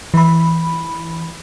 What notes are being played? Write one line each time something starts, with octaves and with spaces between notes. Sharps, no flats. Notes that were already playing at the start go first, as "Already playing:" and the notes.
E3 B5